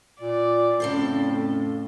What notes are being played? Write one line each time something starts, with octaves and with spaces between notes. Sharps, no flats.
A#2 D5
F2 A2 C#3 A4 C5